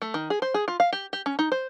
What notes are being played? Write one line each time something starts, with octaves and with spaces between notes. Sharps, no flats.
A3
D#3
G#4
C5
G#4
F4
F5
G4
G4
C#4
D#4
C5